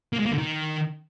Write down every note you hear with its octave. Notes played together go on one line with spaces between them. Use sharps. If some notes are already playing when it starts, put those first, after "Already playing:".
A#3
G#3
A#3
D3
D#3